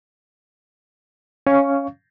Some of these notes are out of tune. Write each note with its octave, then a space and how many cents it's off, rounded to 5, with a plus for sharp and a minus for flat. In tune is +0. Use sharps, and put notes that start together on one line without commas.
C#4 +0 F5 -10 C#6 +15